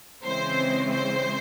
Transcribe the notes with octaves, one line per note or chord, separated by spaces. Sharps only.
C#3 E3 G#3 C4 C5
C5